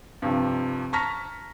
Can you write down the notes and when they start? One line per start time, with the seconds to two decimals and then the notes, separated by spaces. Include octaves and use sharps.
0.22 G2 C3 F3
0.93 A5 A#5 C#6 F6 A#6 B6